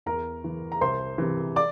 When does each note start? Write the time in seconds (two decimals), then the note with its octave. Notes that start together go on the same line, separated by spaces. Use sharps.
0.06 E2 A#4 A#5
0.44 E3
0.72 A#5
0.81 C2 C5 C6
1.18 C3 E3
1.56 D5 D6